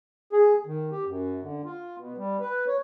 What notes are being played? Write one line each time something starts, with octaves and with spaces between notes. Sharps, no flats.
G#4
D#3
G4
F#2
D3
F4
B2
G3
B4
C#5